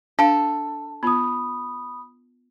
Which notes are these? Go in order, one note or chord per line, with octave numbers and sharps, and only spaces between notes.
D4 A4 F5
B3 F4 B5 D#6